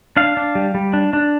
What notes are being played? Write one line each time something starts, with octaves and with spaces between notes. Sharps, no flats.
D4 F5
D4
G3
G3
D4
D4